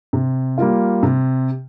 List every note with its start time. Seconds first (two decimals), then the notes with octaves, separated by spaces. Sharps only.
0.13 C3
0.58 G3 A#3 F4
1.03 C3